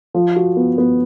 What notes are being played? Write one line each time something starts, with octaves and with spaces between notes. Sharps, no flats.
F3
F#4
B3
B3